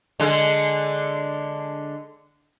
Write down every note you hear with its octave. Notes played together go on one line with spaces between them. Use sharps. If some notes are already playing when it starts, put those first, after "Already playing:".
D3 G#3